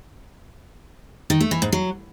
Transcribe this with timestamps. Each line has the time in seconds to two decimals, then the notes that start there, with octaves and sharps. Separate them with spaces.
1.30 D#3
1.41 A3
1.51 E3
1.62 G#2
1.72 F#3